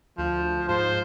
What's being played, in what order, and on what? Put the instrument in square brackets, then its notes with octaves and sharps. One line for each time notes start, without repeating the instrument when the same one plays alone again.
[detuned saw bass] D2 [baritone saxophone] F3
[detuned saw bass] G#2 [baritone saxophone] F3 [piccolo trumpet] C5